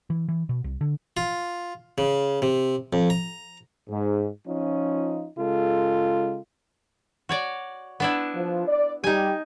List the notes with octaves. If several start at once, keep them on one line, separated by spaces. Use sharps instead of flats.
E3
E3
B2
C2
D3
F4
C#3
C3
F2
A#5
G#2
F3 C#4 D#4 F4
C#3 G#3 F4 A4
F#4 C#5 D5
B3 D4 E4
F3
D5
G3 D#4 G4 G#5